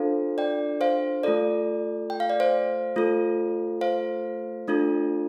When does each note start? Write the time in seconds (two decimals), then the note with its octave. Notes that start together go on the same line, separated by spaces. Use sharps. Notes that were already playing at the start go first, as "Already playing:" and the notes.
Already playing: D4 F4 A4 C5 F5
0.38 D5 G5
0.81 C5 F5
1.23 A3 F4 A4 D5
2.10 G5
2.20 F5
2.30 D5
2.40 C5 F5
2.96 A3 F4 A4
3.81 C5 F5
4.68 A3 D4 F4 A4